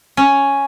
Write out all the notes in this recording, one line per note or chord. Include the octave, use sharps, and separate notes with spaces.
C#4